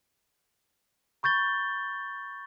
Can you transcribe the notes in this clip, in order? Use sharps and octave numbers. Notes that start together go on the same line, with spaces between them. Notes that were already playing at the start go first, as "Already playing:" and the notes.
B5 C#6 G6 A6 G7